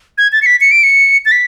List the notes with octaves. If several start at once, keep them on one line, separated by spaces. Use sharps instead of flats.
G#6
A6
C#7
B6
C#7
D7
C#7
A6
B6